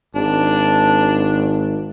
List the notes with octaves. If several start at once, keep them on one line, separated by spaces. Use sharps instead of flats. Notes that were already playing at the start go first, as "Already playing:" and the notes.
G#1 D4